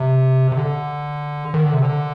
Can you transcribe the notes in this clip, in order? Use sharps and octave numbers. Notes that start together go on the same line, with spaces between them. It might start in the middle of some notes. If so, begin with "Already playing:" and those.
Already playing: C3
C3
D3
D#3
D3
C3
D3